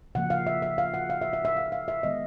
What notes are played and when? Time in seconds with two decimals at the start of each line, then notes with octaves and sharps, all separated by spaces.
0.15 C#3 F3 A#3 F#5
0.30 F5
0.47 E5
0.62 E5
0.78 F5
0.94 F#5
1.10 F5
1.22 E5
1.33 E5
1.45 E5
1.57 F5
1.72 F5
1.88 E5
2.03 D#3 G#3 B3 D#5